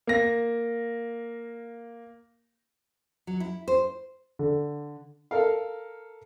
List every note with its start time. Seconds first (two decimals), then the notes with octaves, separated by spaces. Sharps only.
0.07 A#3 A#6
3.27 F#3
3.40 E4
3.68 C5
4.39 D3
5.31 A4 A#4 F5